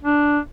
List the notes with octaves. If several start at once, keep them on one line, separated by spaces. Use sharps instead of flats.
D4